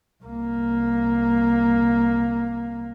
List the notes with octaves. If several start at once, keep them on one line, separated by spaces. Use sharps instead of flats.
C2 A#3